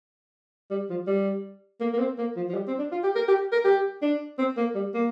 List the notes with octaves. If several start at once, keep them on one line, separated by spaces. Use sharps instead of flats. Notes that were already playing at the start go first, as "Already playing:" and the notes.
G3
F3
G3
A#3
A#3
C4
A#3
F3
F3
G3
C4
D4
F4
G4
A#4
G4
A#4
G4
D4
C4
A#3
G3
A#3